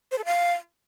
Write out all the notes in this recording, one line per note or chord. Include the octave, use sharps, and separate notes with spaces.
C5
A4
F5